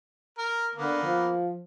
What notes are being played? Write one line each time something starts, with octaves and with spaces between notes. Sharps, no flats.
A#4
D3 A#3 B3
F3